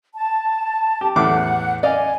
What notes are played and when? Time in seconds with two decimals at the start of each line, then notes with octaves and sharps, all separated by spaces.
0.14 A5
1.01 G4
1.16 E2 A2 F#5 D6
1.83 D5 D#5 F5 G#5